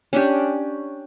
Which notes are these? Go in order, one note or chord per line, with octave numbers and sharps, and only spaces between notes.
C#4 D4 G4